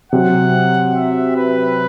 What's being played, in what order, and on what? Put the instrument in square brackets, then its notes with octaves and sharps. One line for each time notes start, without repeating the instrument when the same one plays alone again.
[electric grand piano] C3 F#3 C4 G4 [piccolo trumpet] F#5
[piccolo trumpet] E5
B4